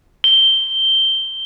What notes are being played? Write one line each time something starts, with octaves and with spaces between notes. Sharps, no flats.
G7